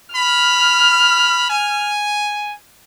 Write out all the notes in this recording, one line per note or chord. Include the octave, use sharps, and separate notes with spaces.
B5 F6
G#5